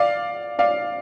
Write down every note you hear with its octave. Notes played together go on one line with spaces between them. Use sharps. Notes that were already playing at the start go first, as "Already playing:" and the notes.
Already playing: D5 F5
D5 F5